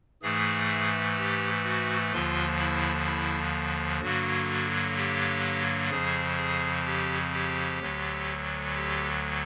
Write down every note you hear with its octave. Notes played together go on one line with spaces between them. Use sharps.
G#2 E3 A3 G#4
G4
F#4
D#2 D3 F3 F4
E4
E4
G2 D3 F#3 A#3 F#4
G4
F2 C#3 F3 G#4
G#4
G4
G4
D2 D3 F#3
G4